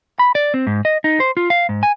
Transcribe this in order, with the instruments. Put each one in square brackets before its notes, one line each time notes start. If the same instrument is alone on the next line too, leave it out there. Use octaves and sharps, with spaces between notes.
[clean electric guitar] B5
D5
C4
G#2
D#5
D#4
C5
F4
F5
G#2
G#5